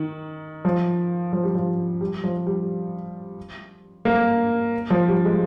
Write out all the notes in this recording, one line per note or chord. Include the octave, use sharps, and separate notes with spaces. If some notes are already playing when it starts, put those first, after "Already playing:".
Already playing: D#3
F3
F3
G3
F3
G3
F3
G3
A#3
F3
G3
G#3